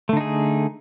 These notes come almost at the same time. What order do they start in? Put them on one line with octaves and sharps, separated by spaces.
A3 D3 D#4 G#4